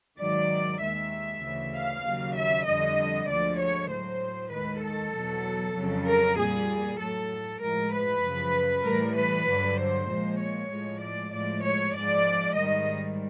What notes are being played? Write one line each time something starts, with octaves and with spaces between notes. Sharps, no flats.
G#2 D#3 F#3 D5
D#2 D#3 G#3 E5
D2 C#3 E3
F5
D#2 C#3 F#3
E5
F2 D3 G3 D#5
D2 D3 F3 G#3 D5
C#5
A2 F#3 C5
D#2 D#3 G#3 B4
A4
E2 B2 F#3
F2 C#3 F#3
A#4
A#2 G3 G#4
A2 F#3 A4
A2 F3 G#3 A#4
B4
F#2 C#3 F3
A2 E3 G3 A#4
B4
G2 D3 F#3
C5
A#2 F3 G#3
C#5
A2 F3 G#3
D5
A2 F3 G#3 D5
C#5
G#2 F3 G#3 D5
G#2 D#3 G3 D#5